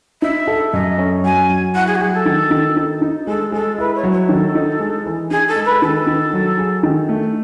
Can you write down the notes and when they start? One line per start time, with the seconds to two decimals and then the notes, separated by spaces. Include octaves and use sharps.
0.22 D#4 E5
0.48 A4
0.73 F#2 D#5
0.98 C#4
1.24 F#3 G#5
1.49 F#3
1.74 E4 F#5
1.87 G#4
1.95 F#4
2.00 F#3 G#4
2.13 A4
2.26 D#3
2.51 D#3
2.76 D#4
3.02 D#4
3.27 G#3 A4
3.52 G#3 A4
3.78 E4 B4
3.95 C#5
4.04 F#3
4.12 C#5
4.29 D#3 A4
4.55 D#4
4.80 G#3
5.06 E3
5.31 D#4 G#4
5.48 A4
5.56 G#3
5.65 B4
5.82 D#3 A4
6.07 D#3
6.33 F#3
6.58 G#4
6.83 D#3
7.09 A3